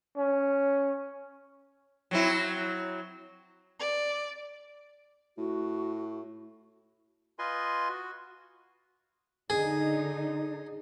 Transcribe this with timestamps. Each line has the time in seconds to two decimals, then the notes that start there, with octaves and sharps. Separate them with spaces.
0.16 C#4
2.11 F#3 C4 E4
3.80 D5
5.38 A2 F#4
7.39 F4 B4 D#5 G#5 C6
7.89 F#4
9.50 D3 D#4 G#4